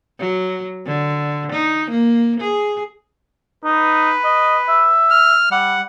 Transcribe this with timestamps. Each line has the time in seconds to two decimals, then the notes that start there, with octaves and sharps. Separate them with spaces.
0.20 F#3
0.86 D3
1.52 D#4
1.90 A#3
2.40 G#4
3.64 D#4 B4
4.24 D#5
4.69 E5
5.11 F6
5.52 G3 F#5